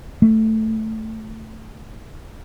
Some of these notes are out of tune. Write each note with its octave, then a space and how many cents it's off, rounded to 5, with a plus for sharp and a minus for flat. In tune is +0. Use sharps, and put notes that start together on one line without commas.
A3 +5